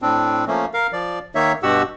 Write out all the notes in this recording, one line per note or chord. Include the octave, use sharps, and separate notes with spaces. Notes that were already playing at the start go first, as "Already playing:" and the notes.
A2 C4 D4
F3 A3 A#3 C#4
A#4 F5
F3 D5
D#3 A#3 D#4 C#5 E5
G2 B2 F#4 G4 F#5 E6